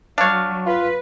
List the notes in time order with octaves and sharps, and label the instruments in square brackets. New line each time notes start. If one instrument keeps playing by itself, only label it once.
[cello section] F#3 [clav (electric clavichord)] D4 C#5 [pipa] F5
[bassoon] F4 [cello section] B4